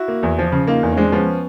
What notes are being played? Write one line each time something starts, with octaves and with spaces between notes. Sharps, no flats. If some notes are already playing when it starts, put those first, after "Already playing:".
Already playing: E4 F#4
A#3
E2
F3
C#3
A#3 D#4 F4
E2
C#4
G#3 C4 D4
F3 B3 C#4